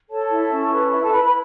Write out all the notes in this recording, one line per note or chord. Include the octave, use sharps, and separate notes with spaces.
A4 C#5 A5
E4
C#4
B4
E4 E5
A4 A5
E4 B4 B5
B4 B5